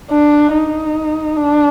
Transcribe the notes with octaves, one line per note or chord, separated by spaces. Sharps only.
D4
D#4
D4